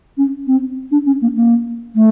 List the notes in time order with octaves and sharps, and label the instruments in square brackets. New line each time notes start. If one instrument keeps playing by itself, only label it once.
[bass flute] C#4
C4
D4
C#4
A#3
A#3
A3